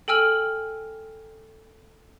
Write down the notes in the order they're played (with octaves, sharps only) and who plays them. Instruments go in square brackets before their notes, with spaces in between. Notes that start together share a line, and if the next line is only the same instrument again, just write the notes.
[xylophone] A4 G5 G#5 E6 F6 F#7